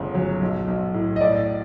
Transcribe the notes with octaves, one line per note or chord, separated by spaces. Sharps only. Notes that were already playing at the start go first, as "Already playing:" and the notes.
Already playing: G1 C#3
F#3
B1
B1
A2
D#5
A2 D5